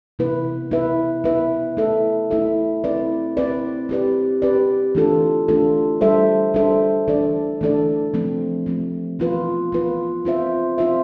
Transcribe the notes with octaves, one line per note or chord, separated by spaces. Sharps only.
C3 E3 B3 E4 B4
B3 E4 B4 E5
B3 E4 B4 E5
A3 E4 A4 E5
A3 E4 A4 E5
C4 E4 B4 D5
C4 E4 B4 D5
C4 G4 B4 D5
C4 G4 B4 D5
E3 A3 D4 F4 A4
E3 A3 D4 F4 A4
G3 D4 A4 C5 E5
G3 D4 A4 C5 E5
E3 A3 D4 A4 D5
E3 A3 D4 A4 D5
F3 A3 C4
F3 A3 C4
E3 B3 F4 B4
E3 B3 F4 B4
C4 F4 C5 E5
C4 F4 C5 E5